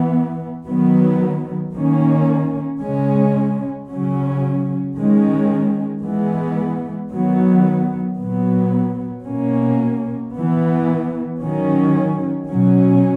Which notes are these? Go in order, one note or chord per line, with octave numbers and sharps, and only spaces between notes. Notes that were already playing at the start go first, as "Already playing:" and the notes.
Already playing: E3 B3
D#3 F#3 B3
D#3 A#3 C#4
C#3 G#3 C#4
C#3 F#3 C#4
D#3 G#3 C#4
E3 G#3 B3
D#3 F#3 B3
A#2 F#3 B3
B2 A#3 C#4
E3 B3
D#3 F#3 C#4
B2 F#3 C#4